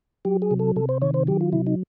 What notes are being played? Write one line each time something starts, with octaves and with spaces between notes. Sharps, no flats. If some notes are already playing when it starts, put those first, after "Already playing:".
F#3 G4
G#4
C3
A4
C3 A4
C5
D#3 C#5
C5
F#3 G4
F4
C3 E4
D#4